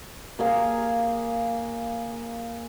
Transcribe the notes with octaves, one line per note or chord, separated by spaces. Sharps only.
A#3 G#4 F5